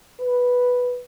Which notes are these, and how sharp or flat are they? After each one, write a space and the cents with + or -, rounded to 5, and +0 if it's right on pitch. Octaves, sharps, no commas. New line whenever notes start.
B4 -5